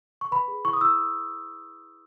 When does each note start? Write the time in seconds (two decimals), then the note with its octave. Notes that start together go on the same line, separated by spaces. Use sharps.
0.21 C#6
0.31 B4 B5
0.48 G#4
0.65 E4 C#6
0.73 D#6
0.81 E4 E6